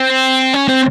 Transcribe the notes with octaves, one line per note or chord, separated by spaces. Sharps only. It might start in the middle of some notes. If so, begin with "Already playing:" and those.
Already playing: C4
C#4
C4